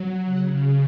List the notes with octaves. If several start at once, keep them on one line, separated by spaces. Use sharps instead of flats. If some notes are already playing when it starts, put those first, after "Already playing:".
Already playing: F#3
C#3 F#5